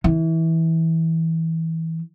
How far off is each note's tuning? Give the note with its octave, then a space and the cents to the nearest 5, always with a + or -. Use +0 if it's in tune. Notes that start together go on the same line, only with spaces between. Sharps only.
E3 -20